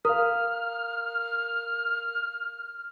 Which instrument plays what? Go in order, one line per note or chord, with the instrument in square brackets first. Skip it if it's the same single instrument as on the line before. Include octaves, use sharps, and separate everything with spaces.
[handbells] A#4 [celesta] F5 D#6 [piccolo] F6